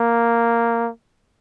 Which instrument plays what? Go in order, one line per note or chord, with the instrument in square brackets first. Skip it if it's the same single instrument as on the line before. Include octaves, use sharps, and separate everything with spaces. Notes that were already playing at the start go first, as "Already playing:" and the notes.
Already playing: [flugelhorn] A#3